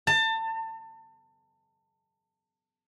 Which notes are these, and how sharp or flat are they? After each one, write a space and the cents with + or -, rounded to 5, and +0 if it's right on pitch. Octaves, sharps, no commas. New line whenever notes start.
A5 +30